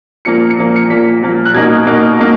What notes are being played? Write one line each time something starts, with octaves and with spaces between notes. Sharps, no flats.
A#2 F3 A#3 C#7
C#7
A#2 F3 A#3
C#7
A#2 F3 A#3 B6
A#2 F3 A#3
F#6
B2 A#3 D#4 G#6
B2 A#3 D#4
A#3 D#4